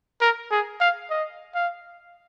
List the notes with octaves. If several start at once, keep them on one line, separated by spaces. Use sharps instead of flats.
A#4
G#4
F5
D#5
F5